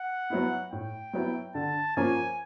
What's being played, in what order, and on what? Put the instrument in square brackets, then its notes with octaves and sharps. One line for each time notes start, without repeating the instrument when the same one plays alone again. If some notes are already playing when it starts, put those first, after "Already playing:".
Already playing: [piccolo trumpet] F#5
[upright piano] F#3 B3 E4
[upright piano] A2 [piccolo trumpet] G5
[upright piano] F#3 B3 E4
[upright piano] D3 [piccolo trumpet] A5
[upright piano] F3 A#3 C#4 [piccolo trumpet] G#5